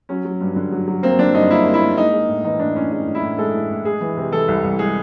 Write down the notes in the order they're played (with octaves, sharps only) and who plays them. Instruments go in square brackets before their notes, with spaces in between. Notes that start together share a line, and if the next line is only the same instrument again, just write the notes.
[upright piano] F#3 C#4
F#3
G2
D3
F#3
F#3
A#3 C4
D3 D4
G2 D#4
A#3 E4
A#3
E4
A#3
G#3 D#4
G#3
A2
E3 D#4
A2 D4
A2 C#4
G#3 D#4
A2
E4
A2
G#3 A4
A2
A2
G#3 G#4
E3
C3
E3 A4
C2
C2
G#3 G#4